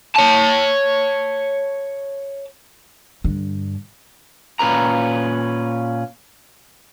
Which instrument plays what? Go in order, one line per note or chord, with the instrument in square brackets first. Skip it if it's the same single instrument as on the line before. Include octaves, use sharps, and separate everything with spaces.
[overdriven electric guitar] C#5 A5
[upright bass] G2 D3
[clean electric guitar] A#2 C#4 B4 A#5